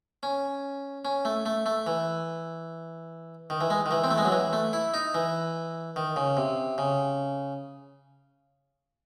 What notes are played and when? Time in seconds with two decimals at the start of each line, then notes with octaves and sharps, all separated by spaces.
0.23 C#4
1.05 C#4
1.25 A3
1.46 A3
1.66 A3
1.87 E3
3.50 D#3
3.61 E3
3.70 G#3
3.86 D#3
3.91 E3
4.04 C4
4.11 A3
4.18 G#3
4.25 F#3
4.32 E3
4.53 A3
4.73 E4
4.94 D#4
5.14 E3
5.96 D#3
6.16 C#3
6.37 C3
6.78 C#3